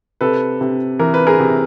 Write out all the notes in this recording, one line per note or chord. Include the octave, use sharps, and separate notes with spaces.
C3 A4 B4
C3
E3 A#4
B4
G#4 A#4
C3